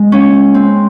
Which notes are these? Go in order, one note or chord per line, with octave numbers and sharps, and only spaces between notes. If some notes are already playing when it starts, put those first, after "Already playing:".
Already playing: G#3
C#4
C4